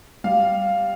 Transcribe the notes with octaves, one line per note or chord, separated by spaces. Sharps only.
G3 F5